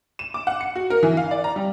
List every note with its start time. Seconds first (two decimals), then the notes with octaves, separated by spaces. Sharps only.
0.19 E7
0.34 D6
0.47 F#5
0.61 C#7
0.75 F#4
0.90 A#4
1.03 E3
1.17 F5
1.31 D5
1.44 A#5
1.56 G3